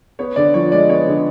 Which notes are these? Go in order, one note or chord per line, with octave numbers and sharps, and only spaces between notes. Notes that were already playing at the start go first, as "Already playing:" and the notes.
B3 C#5
D3 D5
F3 C#5
G#3 D5
B3 C#5
D3